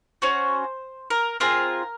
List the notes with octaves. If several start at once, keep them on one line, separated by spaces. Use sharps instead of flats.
C#4 F#4 C5
A#4
C4 F4 G#4 A#4